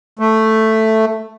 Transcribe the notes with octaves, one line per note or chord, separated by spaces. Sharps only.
A3